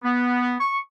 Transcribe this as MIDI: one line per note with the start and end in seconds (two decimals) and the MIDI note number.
0.03 0.55 59
0.61 0.77 85